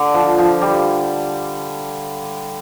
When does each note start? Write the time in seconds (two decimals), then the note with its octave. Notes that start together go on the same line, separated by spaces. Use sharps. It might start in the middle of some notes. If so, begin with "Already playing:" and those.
Already playing: D3
0.14 F3
0.38 F3
0.61 G3